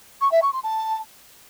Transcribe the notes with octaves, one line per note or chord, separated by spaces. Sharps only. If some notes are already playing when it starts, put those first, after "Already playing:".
C#6
E5
C#6
C6
A5